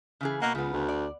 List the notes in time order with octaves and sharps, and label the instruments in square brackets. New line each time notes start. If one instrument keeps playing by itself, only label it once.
[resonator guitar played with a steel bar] C#3 E3 G#4
[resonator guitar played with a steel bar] B2 D#5 F#5 [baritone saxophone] A#3
[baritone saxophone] C#2 [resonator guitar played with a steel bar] C#3 B3
[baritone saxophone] D2
[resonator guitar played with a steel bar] D5